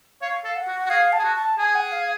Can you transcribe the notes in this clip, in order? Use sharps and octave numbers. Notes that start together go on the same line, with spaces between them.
C#5 F5
A4
F#5
F#4
F#4
G#4 F5
A5
G#4
F#4
A5
G#4 G#5
F#5
F5